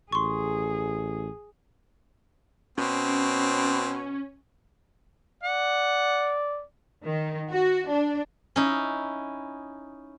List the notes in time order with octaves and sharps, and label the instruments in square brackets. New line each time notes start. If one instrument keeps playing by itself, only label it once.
[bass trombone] A1 [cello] G#4 [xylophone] C6 C#6
[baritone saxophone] B2 [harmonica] C4 [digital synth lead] C#4
[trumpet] D5 [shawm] F#5
[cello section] D#3
F#4
D4
[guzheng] C#4 D#4 E4